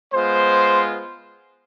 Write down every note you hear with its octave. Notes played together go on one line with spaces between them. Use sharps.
G#3 B3 F4 C5